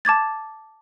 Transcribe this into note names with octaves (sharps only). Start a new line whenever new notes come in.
A5 D6 G#6 A6